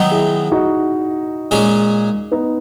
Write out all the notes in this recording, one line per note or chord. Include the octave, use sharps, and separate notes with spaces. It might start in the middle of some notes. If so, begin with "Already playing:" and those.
Already playing: D#3 F#3 B3 D#4
E4 G#4
D#4 F#4
A#2 G#3 C#4 G#4
B3 D#4